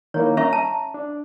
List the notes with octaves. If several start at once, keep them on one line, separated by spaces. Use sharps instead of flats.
D#3 A#3 E4 C#5
C#4 E5 A#5 C#6
A5
D4